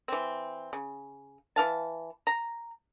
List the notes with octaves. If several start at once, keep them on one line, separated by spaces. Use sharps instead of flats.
E3 C4
C#3
E3 F5 A5
A#5